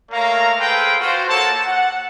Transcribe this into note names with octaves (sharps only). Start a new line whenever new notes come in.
A3 A#3 C#5 F5 A#5
G#4 A4 B4 C5 F5 G5
F4 F#4 C5
A#3 A4 C#5 F#5 A5
F#5